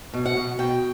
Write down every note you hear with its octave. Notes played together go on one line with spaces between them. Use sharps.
B2
F#5
B2
B2 G5